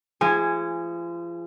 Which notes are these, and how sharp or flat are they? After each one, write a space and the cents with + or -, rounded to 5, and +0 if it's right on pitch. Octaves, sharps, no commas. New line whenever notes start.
F3 -35 G#4 -10 G#5 +0